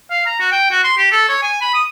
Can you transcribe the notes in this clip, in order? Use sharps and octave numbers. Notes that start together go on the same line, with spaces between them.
F5
A#5
F#4
G5
F#4
C6
G4
A4
C#5
G#5
B5
D#6